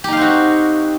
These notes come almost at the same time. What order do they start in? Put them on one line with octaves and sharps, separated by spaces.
G4 D#4 F5 C4 F#4